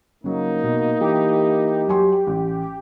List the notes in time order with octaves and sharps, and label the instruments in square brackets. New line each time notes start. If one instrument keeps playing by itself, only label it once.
[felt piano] C#3 F#3 [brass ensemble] A#3 D#4
[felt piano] B2
[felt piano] E3 [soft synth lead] G4
[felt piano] F#3 G#5 C6
A1